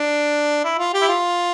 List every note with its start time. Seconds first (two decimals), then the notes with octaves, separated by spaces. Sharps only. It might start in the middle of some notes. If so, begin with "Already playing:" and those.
Already playing: D4
0.64 E4
0.79 F4
0.94 G4
1.02 E4
1.08 F4